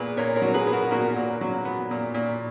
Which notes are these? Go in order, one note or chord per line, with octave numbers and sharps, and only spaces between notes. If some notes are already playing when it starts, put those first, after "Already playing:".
Already playing: A#2 B3 G#4 B4
A#2 A#4 C#5
A#4 C#5
F#3
G#4 B4
B3
F#4 A#4
A#2 F#4 A#4
A#2
F#3
B3
A#2
A#2